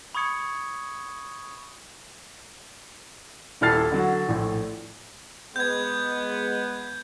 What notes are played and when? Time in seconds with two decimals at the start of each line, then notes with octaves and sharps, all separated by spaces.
0.15 B5 C#6 D#6 G#6 C#7
3.61 D#1 E4 A4 F6 A6 C7
3.92 D3 F#3
4.28 A#1 A2
5.56 G#3 B3 G6 G#6